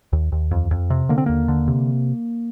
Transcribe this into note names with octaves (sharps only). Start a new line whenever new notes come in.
D#2
D#2
F2
F2
C3
D3 A#3
C4
D#2 A#3
D3
C3